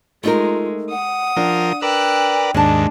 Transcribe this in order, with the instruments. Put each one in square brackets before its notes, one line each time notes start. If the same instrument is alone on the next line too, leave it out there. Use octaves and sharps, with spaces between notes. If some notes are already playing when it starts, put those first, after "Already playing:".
[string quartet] G#3 [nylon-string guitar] A3 D#4 A#4 [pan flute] F4
[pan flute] F#5 [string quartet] D#6
[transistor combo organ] F3 A#4 [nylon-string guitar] D4
[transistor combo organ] A#4 B4 D5 [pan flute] G5 [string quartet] E6 F#6
[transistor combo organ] D#2 G#2 [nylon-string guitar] G#3 A5 [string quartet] D4